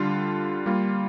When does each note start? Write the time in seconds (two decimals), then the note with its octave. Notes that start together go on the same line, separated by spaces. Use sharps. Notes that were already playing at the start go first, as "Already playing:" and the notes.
Already playing: D3 G3 D4 F4
0.66 G3 A#3 F4